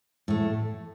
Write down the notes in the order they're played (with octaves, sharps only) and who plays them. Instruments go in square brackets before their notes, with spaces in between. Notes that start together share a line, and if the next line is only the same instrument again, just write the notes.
[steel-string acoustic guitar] A2 A3